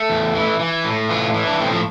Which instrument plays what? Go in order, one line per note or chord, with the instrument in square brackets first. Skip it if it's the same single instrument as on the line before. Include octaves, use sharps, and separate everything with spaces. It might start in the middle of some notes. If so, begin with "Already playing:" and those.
Already playing: [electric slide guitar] A3
E2
E3
E3
A2
E3 F4
E3
D4
A2 C4
F3